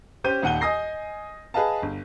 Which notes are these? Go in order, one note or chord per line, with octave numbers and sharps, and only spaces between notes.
C#4 G4 C5 G6 D#7
D#1 D#2 F#5 D#7 G7
D#5 G#5 D#6 A#6 C7
G#4 B4 D#5 F5 A5
G1